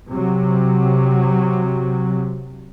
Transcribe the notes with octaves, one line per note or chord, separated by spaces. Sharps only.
C3 F#3